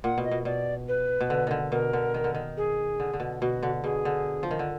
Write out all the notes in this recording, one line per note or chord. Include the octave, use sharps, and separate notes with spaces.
A#2 F#5
B2
D#5
B2
B2 D5
B4
B2
D3
D3 D#3
B2 A#4
D3
D#3
D3
D#3
G#4
D3
D3
B2
B2 F#4
D3
B2 G#4
D3
F3
D#3
D3